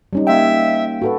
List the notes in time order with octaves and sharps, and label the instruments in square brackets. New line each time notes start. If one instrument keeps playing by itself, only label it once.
[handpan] G3 C#4 D#4
[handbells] A#3 G5 [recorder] E5
[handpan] F#4 A4 B4